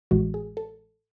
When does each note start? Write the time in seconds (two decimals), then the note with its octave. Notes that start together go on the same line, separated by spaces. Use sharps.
0.11 A1 A2 E3 G#3 F#4
0.34 G#4
0.57 A4